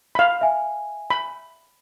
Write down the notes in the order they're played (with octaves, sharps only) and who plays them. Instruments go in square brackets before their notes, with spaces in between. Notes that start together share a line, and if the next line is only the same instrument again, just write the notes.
[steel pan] F5 B5
[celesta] E5 G#5
[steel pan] B5